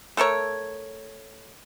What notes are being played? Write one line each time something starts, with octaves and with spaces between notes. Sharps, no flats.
A3 A4 A#4 C#5